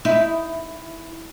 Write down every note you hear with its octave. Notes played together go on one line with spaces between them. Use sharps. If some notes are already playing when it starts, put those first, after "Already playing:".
D#4 E4